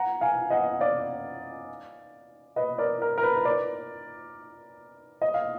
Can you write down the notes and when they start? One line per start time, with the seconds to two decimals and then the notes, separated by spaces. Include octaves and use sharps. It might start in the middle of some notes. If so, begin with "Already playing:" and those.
Already playing: F#5 A#5
0.21 F5 G#5
0.50 D#5 F#5
0.80 D5 F5
2.56 B4 D#5
2.78 A#4 D5
3.02 A#4
3.18 A#4
3.23 B4
3.37 B4
3.45 A#4 D5
5.22 D#5
5.34 F5